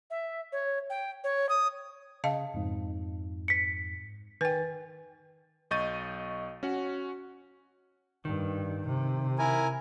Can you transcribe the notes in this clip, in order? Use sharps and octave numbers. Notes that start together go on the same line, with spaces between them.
E5
C#5
G5
C#5
D#6
C#3 D#5 F5 A5
F2 G#2
B6 C#7
D#3 B4 G5 G#5 A6
B1 D#5 C#6 G6 A6 D#7
C#4 F#4 F#5
G2 D#3
C3
E4 A#4 G#5